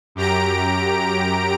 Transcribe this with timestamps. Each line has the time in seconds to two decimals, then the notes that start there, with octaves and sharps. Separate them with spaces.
0.15 F#2 G4 A#5 D7